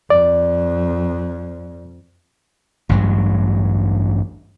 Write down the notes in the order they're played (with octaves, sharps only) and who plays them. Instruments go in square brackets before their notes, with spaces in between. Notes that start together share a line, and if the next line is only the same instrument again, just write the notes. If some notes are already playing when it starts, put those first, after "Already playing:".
[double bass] F2 [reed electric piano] D5
[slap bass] A1 D2 G2 F#3